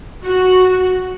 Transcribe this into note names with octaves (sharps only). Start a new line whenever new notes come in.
F#4